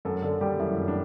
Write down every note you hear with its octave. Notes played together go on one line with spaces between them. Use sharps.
F#2 A4
D3 A4
G3 G4
F#2 E4
F#2
D4